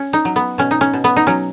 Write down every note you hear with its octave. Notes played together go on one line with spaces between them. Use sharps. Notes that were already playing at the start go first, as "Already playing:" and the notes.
Already playing: C#4
D#4
F#3
B3
B2 C#4
D#4
C#4
B2
B3
D#4
F#3 C#4